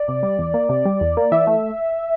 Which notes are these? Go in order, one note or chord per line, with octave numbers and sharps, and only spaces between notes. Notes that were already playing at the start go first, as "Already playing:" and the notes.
Already playing: D5
C3
G3
E2
A#3
C3
G3
E2
A#3
E3 E5
A3